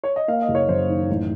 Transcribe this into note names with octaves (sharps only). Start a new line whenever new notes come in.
C#5
D#5
A#3 F5
D#5
F#1
C#5
F#2 C5
D#3
A1